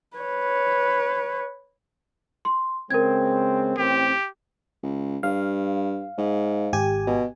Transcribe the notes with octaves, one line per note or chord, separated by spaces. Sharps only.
B4 C#5
C6
C#3 G#3 C4 A#4 G#6
A1 C4 G4
C#2
G2 F5
G#2
G#1 G4 G#5
B2